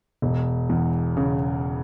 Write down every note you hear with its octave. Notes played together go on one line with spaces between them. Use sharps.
E1
E2
C#3